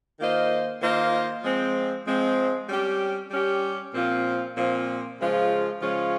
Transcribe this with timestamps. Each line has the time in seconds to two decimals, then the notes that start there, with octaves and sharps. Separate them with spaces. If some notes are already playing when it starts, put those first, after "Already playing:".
0.19 D#3 A#3 F4 C5 D#5
0.81 D#3 A#3 F4 C5 D#5
1.43 F3 G#3 C4
2.06 F3 G#3 C4
2.69 G3 C#4 G4
3.31 G3 C#4 G4
3.94 A#2 F3 C4 F4
4.56 A#2 F3 C4 F4
5.19 C#3 F3 G#3 C#4 F4
5.81 C#3 F3 G#3 C#4 F4